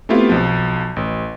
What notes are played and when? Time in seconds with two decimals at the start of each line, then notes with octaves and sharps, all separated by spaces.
0.09 A3 B3 C4 E4 F4 G4
0.29 B1 F3
0.96 A1